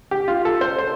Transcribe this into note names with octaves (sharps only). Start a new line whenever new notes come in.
G4
F4
A4
C5
C5